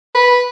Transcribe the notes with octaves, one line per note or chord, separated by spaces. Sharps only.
B4